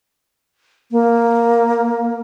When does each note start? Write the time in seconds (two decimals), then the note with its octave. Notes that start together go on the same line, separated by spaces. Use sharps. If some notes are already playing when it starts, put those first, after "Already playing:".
0.92 A#3